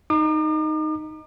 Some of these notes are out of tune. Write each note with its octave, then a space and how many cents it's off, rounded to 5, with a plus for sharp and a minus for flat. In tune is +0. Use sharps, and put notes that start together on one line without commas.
D#4 +0 D6 +45